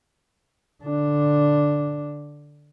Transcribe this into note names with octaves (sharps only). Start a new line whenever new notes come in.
D3 D4